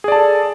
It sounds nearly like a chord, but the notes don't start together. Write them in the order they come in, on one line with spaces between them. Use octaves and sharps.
G#4 D5 A5 A4